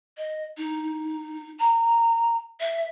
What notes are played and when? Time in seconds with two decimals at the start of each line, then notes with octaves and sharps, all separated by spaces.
0.17 D#5
0.57 D#4
1.59 A#5
2.60 E5